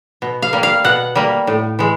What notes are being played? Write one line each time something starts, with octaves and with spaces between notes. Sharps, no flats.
B2
F5
G3 A#3
F5
B2 F#5
G3 A#3
A2
E3 G#3